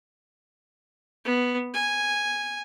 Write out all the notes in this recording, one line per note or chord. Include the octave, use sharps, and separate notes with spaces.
B3
G#5